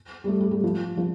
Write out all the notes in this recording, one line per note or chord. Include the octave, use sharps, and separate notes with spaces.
G3
A3
G3
G3
F3
F3